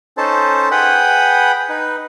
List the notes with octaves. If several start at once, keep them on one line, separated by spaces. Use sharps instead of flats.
C#4 D#4 A4 C5 A5
G#4 B4 F#5 G5 B5 D#6
D#4 B4